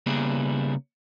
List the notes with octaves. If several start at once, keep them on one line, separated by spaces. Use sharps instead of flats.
C#3 G3 A#3 B3 E4 G#4